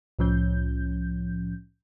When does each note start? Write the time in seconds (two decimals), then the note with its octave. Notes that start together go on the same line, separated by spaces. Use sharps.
0.19 C2 A2 F3 C#4 G6